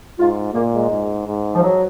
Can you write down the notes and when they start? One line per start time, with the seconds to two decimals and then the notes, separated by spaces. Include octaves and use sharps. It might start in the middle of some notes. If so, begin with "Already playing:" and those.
0.19 G#2 F4
0.54 A#2 A#3
0.73 G#3
0.90 G#2
1.27 G#2
1.55 F3
1.63 F#3